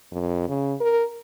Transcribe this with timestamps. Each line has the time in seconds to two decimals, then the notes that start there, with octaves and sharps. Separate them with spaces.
0.12 F2
0.48 C#3
0.80 A#4